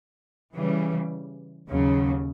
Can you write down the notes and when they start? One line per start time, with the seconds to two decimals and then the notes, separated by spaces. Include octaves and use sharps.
0.55 C#3 E3 G3
1.69 D#2 C#3 F#3